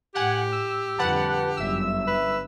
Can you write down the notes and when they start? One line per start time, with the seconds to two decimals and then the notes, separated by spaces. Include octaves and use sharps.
0.15 A2 G4 F#5 G#5
0.52 E6
0.98 F2 D3 G3 B4 F#5 A5
1.57 G1 F#2 E5 E6
2.07 B4